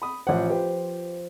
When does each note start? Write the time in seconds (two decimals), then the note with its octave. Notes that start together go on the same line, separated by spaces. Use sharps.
0.02 B5 D#6
0.27 A1 F3 C5 F#5
0.49 G4 B4